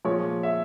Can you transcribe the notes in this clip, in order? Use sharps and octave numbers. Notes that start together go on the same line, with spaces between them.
A#2 F3 G#3 C#5
E5